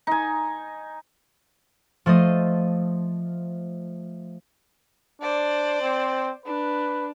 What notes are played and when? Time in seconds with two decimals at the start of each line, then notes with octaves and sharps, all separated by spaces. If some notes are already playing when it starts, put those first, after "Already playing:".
0.07 D#4 G#5
2.06 F3 A3 C5 D#5
5.22 D4 C5 D5
5.81 C4
6.46 D4 B4